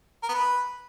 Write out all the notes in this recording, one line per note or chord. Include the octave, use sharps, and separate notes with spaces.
A#4
B3
B4